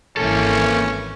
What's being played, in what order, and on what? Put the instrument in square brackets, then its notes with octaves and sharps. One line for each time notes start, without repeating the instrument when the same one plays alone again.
[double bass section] G#1 E3 [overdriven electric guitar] A#3 A4 [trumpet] C#4